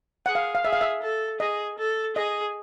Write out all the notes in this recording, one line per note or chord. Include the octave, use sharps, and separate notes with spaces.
G#4 F#5
F5
F5
G#4 E5
F5
E5
A4
G#4 D#5
A4
G#4 D#5